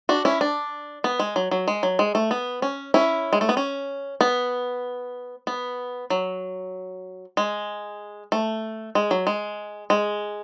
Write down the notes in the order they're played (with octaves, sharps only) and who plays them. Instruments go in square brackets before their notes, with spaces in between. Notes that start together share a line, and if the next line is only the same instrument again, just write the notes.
[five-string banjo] D4 F#4
C#4 E4
D4
B3
G#3
F#3
F#3
G#3
F#3
G#3
A3
B3
C#4
C#4 E4
G#3
A3
B3
C#4
B3
B3
F#3
G#3
A3
G#3
F#3
G#3
G#3